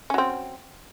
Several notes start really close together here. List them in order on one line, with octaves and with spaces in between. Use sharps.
C#4 F#3 C4